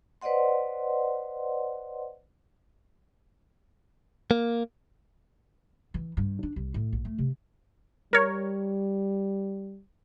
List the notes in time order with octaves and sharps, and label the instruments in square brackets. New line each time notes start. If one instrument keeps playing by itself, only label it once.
[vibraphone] B4 C5 D5 D#5 F#5 C6
[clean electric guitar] A#3
[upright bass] E3
G2
D4
C2
A2
A#1
A3
C3
[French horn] G3 [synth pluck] A#4 C#5